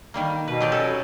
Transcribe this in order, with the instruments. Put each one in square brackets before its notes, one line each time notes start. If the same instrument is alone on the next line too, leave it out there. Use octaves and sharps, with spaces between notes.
[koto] D#3 G3 A#3
[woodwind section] B2 [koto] B4
[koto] F#3 G4 D5
C#4 A4